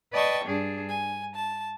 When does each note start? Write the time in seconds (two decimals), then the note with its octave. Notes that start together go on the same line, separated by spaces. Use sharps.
0.12 B4 D5 D#5 G5 A5 C#6
0.45 G2 D4 G#4
0.89 G#5
1.35 A5